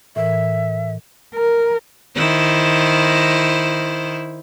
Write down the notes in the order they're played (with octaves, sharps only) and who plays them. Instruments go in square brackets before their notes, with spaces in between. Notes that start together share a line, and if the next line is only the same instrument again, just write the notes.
[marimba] A2 E3 A#4 [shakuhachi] E5
[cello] A#4
[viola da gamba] D#3 E4 C5